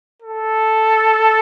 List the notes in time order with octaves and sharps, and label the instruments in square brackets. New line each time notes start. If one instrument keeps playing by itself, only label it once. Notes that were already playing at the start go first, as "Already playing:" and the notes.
[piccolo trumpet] A4